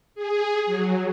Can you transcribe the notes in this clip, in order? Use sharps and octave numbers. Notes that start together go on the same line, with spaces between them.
G#4
F#3